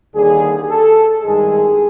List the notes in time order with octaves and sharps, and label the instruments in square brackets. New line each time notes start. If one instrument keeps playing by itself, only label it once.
[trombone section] D#2 D3 G3 G#4
A4
G#1 G2 D#3 G#3 G#4